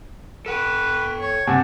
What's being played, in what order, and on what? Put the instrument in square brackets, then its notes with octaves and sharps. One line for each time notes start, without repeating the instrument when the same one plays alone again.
[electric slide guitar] A4 F#5 G5 [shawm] B4
[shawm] C#5
[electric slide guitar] G2 [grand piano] C3 G#5 [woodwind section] F#5 A5